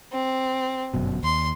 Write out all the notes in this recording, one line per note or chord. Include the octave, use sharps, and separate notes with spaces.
C4
G1 F#2 B2
D#2 C6